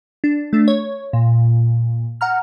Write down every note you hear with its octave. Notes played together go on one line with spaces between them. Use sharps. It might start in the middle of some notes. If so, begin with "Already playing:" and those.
D4
A3 D4
C#5
A#2
F#5 A#5 F6